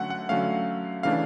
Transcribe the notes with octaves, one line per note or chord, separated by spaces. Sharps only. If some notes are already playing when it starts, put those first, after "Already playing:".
Already playing: D3 F#3 A3 C#4 F#5
F#5
D3 F#3 A3 C#4 F5
C#3 E3 A3 D4 F5